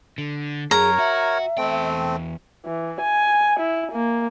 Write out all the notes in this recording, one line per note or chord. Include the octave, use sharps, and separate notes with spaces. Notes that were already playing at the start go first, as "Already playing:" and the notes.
D3
F#2 G#4 A#4 C#5 A#5
F#4 E5
E2 A3 C4 G5
E3
G#5
E4
A#3